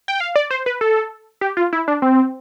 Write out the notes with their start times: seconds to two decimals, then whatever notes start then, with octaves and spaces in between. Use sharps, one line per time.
0.08 G5
0.20 F5
0.36 D5
0.51 C5
0.66 B4
0.81 A4
1.41 G4
1.57 F4
1.73 E4
1.88 D4
2.02 C4